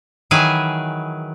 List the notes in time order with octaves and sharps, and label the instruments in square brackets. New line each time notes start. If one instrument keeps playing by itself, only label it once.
[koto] D#3 E3 F#3 G#4 B4 G#5